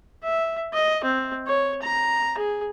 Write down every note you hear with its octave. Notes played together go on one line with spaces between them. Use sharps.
E5
D#5
C4
C#5
A#5
G#4